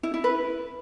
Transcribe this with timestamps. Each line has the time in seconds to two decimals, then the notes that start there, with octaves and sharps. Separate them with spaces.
0.03 E4
0.14 E4
0.24 B4